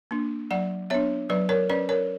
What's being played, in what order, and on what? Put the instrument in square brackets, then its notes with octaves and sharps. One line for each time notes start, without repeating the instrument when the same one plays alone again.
[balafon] A#3 D4
F#3 D5 F#5
B3 D4 C#5 E5
F#3 B4 D5
A#4 C#5
C#4 B4 D5
A#4 C#5